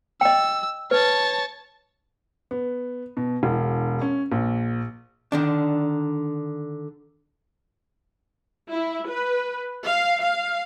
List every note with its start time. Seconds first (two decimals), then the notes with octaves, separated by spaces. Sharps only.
0.21 D#5 G5 E6
0.91 B4 C#5 A5
2.51 B3
3.17 B2
3.43 E1
4.01 C#4
4.32 A#1
5.32 D3 D#3 D4
8.70 E4
9.09 B4
9.85 F5
10.21 F5